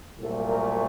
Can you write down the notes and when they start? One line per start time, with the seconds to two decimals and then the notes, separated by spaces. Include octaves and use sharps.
0.20 C2 A#2 F#3 A3 A4
0.48 A#4